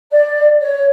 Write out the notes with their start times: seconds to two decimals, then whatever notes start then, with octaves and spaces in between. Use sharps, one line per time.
0.11 D5
0.61 C#5